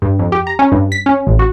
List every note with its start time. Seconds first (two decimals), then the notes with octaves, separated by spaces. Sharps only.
0.02 G2
0.19 F2
0.32 G4
0.47 A#5
0.59 C#4
0.72 G2
0.92 B6
1.06 C#4
1.27 A1
1.39 F#4